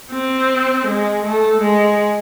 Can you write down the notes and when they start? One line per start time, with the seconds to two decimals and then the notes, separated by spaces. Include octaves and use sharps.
0.12 C4
0.87 G#3
1.25 A3
1.61 G#3